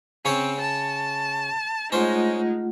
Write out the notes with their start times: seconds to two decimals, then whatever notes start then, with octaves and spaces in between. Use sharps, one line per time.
0.25 C#3 C4 C#4 C#5
0.61 A5
1.92 G#3 A3 C#4 D#4 F4 C5 F#5